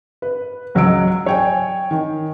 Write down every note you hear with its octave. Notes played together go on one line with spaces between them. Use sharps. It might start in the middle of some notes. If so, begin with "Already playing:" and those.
B4
C#2 F#3 D#5 E6 D7
C#5 G5 G#5
D#3